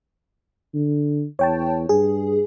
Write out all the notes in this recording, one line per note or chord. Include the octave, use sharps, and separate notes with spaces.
D3
E2 C#5 G5 A5
G2 G#4